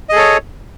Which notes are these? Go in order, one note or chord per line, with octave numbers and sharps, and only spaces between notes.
G#4 A4 C#5 D#5